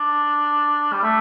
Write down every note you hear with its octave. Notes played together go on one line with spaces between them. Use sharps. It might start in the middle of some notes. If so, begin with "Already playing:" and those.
Already playing: D4
G3
A3